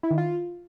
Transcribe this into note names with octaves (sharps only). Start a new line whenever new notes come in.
E4
D#3
F4